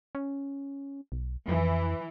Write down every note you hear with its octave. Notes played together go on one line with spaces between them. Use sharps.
C#4
B1
F2 E3